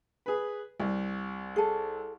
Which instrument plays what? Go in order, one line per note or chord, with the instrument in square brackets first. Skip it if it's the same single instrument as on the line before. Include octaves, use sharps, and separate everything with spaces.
[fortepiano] G#4 B4
C2
[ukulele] G#4 A4